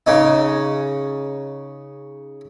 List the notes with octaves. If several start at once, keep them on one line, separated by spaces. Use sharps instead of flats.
C#3 C#4 D#4